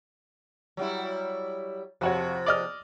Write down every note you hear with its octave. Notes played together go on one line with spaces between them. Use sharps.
F#3 G3 E4
F2 C3 F3 F#4 C#5
D5 D#5 F6